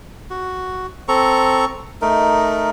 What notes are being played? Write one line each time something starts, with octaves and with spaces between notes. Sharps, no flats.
F#4
C4 A4 A#5 C#6
A3 D#4 A#4